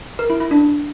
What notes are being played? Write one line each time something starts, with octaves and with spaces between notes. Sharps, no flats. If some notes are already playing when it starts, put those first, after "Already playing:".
A#4
E4
E4
D4